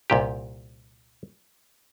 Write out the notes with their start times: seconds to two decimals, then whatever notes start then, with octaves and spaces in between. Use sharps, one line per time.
0.10 C2 A#2 G4